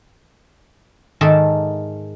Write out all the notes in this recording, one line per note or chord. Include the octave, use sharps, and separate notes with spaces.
G#2 D#3 A4 D5 E5